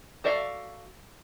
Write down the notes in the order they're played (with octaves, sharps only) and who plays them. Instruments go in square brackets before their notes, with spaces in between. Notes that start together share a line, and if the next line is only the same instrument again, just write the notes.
[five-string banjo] F#4 A4 D5 E5 F5